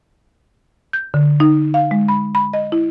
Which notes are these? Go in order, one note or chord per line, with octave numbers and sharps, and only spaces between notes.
G6
D3
D#4
F5
G#3
B5
B5
D#5
E4